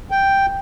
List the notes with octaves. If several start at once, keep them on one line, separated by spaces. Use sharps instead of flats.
G5